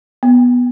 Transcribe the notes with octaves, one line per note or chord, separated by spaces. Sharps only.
B3